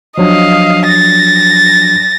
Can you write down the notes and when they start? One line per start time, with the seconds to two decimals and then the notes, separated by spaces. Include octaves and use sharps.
0.18 F3 F#3 D4 D#5 F5
0.89 A6 A#6